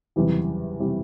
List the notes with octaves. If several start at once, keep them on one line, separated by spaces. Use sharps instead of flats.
F#1 E2 C3 E3 G3
C3 E3 G3